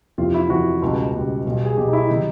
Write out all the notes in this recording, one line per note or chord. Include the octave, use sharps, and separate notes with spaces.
F2 C3 E3 F4
E4
F2 C3 E3 F#4
C#2 B2 G3
C#2 B2 G3
B1 B2 G3
G#4
B1 B2 G3 G4
D#4
E4
C3 D#3 F#3 D#4